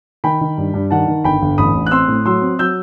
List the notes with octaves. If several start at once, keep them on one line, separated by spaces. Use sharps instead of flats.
D#3 G5 B5
D#3
G2
G2
D#3 F#5 A5
D#3
G1 G5 B5
G1
A1 B5 D#6
A1
F#6
C4 C6 E6
A2
F#3 C6 E6
C4
F#3 E6 G6